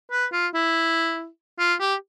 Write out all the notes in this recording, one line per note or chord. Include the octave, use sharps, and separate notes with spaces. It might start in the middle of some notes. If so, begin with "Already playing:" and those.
B4
F4
E4
F4
G4